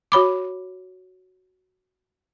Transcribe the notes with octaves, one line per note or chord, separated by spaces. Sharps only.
F#4 C#5 B5 D6